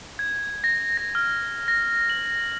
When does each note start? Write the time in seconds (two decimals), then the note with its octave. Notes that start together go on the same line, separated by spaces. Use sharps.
0.19 G#6
0.64 A#6
0.97 A#6
1.15 F6
1.68 A#6
2.10 F#7